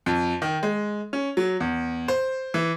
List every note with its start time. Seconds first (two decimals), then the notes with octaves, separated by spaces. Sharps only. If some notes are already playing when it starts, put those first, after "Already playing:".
0.06 F2
0.42 D#3
0.63 G#3
1.13 C#4
1.37 F#3
1.60 E2
2.08 C5
2.54 E3